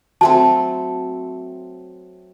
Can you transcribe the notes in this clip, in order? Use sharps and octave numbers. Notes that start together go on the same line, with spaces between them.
F#3 A3 C4 A5